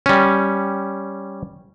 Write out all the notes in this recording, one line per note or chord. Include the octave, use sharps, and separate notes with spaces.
G3 C#4